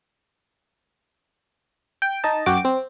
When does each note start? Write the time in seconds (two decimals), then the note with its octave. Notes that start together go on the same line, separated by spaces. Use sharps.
2.02 G5
2.24 D#4 D#5 A5
2.46 F#2 F#4 G5 D6
2.65 C4